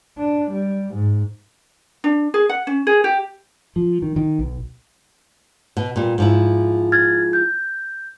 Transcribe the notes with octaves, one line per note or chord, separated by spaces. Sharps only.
D4
G3
G#2
D4
G#4
F#5
C#4
G#4
G4
F3
D#3
D#3
B1
B2
A#2 G3
G#2 F3 E4
F6 G#6 A6
G6